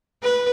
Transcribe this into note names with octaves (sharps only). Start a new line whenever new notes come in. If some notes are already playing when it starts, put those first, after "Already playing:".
B4